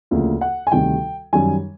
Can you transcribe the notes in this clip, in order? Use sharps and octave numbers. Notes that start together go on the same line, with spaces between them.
D2 C#3 F3 A#3
F#5
G#5
D2 C3 D#3 G3 G5
F#2 D#3 G3 G#5